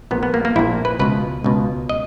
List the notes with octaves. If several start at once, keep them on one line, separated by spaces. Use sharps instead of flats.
A#1 A#2 B3
B3
A#3
A#3
A#1 A#2 E4
B4
C#2 B2 B4
C#2 B2
D#5